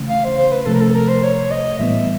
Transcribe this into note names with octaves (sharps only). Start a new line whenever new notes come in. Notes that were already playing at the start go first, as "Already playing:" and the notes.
Already playing: C#3 E3 A3 C#4
F5
C5
C5
B4
C3 F3 A3 A4
A#4
A4
A#4
C5
C#5
D#5
A2 E3 G3 B3 E5